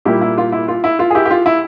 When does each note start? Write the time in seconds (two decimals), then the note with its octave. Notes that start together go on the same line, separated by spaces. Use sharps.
0.05 A#2 G3 A#3 E4 G4
0.21 E4
0.38 F4
0.52 E4
0.68 F4
0.84 E4
0.99 F4
1.10 G#4
1.15 E4 G4
1.25 G4
1.31 F4
1.46 E4